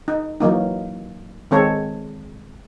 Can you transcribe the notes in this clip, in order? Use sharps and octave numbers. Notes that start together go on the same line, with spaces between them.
D#4
E3 F#3 A#3 D#4
D#3 G#3 C4 A4 C#5